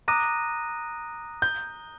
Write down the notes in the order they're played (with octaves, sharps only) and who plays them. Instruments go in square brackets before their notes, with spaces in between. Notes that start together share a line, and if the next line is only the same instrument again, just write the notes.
[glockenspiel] A#5 D#6 F#6 A#6 D#7 [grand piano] D6
[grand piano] G6